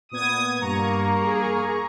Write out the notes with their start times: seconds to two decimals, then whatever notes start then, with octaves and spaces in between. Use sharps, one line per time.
0.11 A#2 B3 D#6 G#6
0.61 G2 A#3 A#5 C#6
1.25 G#4